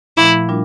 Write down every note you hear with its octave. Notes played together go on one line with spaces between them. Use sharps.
A#2 F3 A3 E4
A#2 G3 D4 F4 A#4